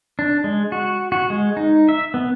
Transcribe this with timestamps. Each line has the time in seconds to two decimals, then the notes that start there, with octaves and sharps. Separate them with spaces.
0.19 D4
0.44 G#3
0.72 F#4
1.12 F#4
1.30 G#3
1.57 D#4
1.89 E5
2.14 B3